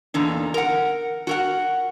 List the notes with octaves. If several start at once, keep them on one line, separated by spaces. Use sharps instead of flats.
E2 A#2 D3 D#4
A#4 F#5
F#4 A#4 F#5